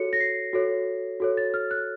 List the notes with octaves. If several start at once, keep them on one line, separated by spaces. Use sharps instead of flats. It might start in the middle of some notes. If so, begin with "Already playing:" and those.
Already playing: F#4 A4 C#5 C#7
A#6
C7
F#4 A4 C#5
F#4 A4 C#5
A6
F6
F#6